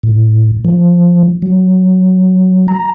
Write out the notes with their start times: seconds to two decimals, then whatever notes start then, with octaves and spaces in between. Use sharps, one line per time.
0.03 A2
0.65 F3
1.42 F#3
2.68 A#5